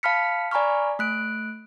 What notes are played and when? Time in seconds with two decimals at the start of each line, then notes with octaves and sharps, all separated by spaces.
0.03 F5 A5 B5 F6 B6 C#7
0.51 D5 G#5 A#5 B5 C#6 F6
0.99 A3 F#6 D7